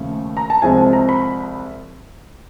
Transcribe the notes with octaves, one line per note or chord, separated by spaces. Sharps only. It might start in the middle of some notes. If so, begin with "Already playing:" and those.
Already playing: D#2 C#3 F3 A3
A#5
A5
C2 C3 F3 G#3 G#5
A5
A#5
B5